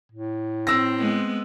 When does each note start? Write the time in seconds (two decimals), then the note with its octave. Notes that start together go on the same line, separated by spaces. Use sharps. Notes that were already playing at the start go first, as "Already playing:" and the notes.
0.12 A2
0.67 C4 E6 A#6
0.98 G#3 B3